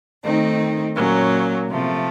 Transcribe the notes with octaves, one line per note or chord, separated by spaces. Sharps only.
D#3 A3 C4 D#4
A#2 F#3 A#3 C#4
C3 F3 A3